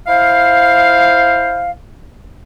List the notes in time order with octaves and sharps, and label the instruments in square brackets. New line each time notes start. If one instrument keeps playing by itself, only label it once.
[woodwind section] E4 C5 F5